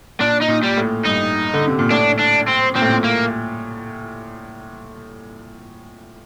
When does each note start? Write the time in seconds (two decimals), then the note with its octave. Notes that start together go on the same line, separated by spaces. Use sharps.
0.20 A#2 D4
0.42 D#4
0.48 A#2
0.64 G3
0.77 A2
1.06 G2 D#4
1.54 D3
1.67 C3
1.79 A#2
1.91 A2 D4
2.19 D4
2.47 C4
2.75 A#2 C4
2.82 A2
2.89 A#2
3.04 A#3